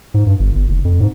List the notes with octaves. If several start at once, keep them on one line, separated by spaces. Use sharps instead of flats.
G#2
G2
G1
G1
F1
F2
G#2